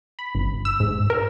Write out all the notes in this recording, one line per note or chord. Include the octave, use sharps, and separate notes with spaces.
B5
G1
E6
G#2
A#4